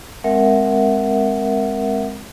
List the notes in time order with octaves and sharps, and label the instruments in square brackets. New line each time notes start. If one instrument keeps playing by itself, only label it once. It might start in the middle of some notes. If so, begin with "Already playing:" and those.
[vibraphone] G#3 C4 A#4 E5 F#5